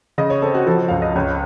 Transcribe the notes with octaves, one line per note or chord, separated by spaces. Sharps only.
C#3 D#5
C#5
C4 A4
F#4
F3 A4
C#2 F5
D#5
C#2 C#5